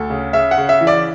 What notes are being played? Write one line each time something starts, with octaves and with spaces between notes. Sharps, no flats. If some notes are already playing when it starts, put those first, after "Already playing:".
Already playing: D2 A4
C#3
C#3 E5
F#5
C#3
E5
E3
D5